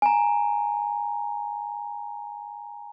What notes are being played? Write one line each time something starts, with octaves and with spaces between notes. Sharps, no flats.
G#5 A#5